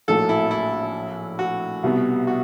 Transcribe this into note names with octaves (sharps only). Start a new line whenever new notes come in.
A#1 A2 F#3 A#3 A4
E4
E4
F#4
C2 B2 G3 B3
F#4